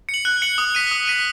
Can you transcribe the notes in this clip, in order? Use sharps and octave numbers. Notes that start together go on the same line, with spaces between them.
C#7
F#7
F#6
C#7 F#7
D#6
B6 D#7
D#6
B6 D#7